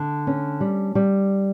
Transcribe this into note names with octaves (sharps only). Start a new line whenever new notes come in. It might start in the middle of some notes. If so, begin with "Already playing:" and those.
Already playing: D3
C#4
G3
G3